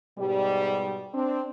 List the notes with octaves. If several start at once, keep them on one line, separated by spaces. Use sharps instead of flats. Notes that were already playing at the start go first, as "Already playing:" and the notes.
G#2 B2 G3
C4 D4